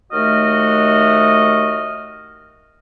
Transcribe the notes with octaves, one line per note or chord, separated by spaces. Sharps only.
D#2 A3 F#4 D#5 F6